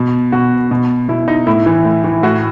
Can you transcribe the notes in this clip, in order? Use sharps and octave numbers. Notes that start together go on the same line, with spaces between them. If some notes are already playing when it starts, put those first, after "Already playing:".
Already playing: B2
B2 F#4
B2
B2 E4
D#4
A2 E4
E3
A2
E3
A2 F#4